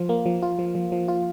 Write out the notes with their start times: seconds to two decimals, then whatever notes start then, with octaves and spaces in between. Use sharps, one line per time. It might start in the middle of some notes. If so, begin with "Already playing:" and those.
Already playing: F3 F4
0.09 A#3
0.26 F3
0.42 F4
0.59 F3
0.75 F3
0.92 F3
1.08 F4